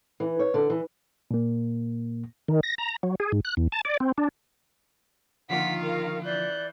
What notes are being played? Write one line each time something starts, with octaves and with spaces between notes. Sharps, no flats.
E3
C#5
D3
E3
A#2 A#3
D#3
A#6
A#5
F#3
G#4
G#2
F#6
E2
A5
D5
C4
D4
D3 D#3 F3 A#3 F4 F#5 B6
A#4 F5
E3 D5 F#6 G6